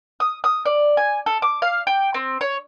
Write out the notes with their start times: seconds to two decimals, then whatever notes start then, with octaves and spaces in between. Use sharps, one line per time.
0.20 D#6
0.44 D#6
0.65 D5
0.97 G#5
1.26 A4
1.42 D6
1.62 F5
1.87 G5
2.14 C4
2.41 C#5